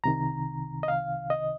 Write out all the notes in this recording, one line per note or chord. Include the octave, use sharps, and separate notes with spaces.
C2 C3 D#3 A#5
D#5
F5
D#5